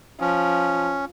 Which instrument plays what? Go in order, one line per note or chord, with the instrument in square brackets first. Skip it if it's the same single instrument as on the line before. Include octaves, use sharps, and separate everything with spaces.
[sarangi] F3 [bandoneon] C#4